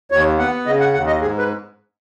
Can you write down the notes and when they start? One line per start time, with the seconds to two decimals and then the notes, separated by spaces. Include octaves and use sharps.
0.11 D#2 C#5
0.39 B3 F#5
0.66 C#3 D#5
0.80 F#5
0.94 D#2 F#5
1.07 D#5
1.21 G#2 G#4
1.38 B4